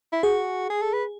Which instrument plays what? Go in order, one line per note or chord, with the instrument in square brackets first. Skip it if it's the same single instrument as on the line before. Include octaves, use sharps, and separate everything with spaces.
[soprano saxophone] E4
[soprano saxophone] F#4 [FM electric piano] G#4
[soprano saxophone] G#4
A4
B4